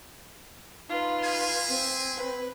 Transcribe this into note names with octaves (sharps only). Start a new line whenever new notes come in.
D#4 F4 B4
E4 G#4 G#5
C4
B4